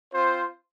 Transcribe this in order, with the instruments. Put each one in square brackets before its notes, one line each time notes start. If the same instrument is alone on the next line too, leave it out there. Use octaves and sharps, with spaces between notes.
[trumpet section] C4 F4 C5